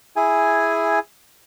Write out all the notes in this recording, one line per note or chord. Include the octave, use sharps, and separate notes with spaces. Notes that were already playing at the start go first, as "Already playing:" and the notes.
E4 G#4 G#5